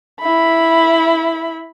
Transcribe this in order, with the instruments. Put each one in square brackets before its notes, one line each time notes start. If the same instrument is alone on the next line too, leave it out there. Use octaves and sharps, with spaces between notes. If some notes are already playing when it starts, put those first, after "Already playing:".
[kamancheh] E4 B5